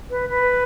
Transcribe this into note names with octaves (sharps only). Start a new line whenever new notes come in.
B4
B4